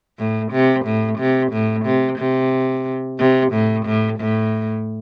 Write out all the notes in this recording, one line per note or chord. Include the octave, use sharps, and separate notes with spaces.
A2
C3
A2
C3
A2
C3
C3
C3
A2
A2
A2